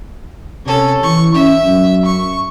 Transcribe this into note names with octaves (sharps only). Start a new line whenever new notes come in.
C3 C#4 A4
E3 C#6
C#4 E5
F#2
C#6